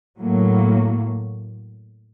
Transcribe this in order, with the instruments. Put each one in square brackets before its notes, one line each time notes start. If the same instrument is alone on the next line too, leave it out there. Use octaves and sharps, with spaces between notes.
[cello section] A2 F#3 A#3